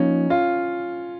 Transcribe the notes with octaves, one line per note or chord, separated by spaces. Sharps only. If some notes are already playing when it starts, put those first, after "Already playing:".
Already playing: F3 A#3 C#4 D#4
F4